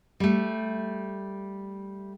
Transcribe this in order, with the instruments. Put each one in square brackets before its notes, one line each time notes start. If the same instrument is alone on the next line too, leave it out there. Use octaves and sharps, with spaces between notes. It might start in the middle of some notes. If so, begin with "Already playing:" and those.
[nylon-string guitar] G3 A3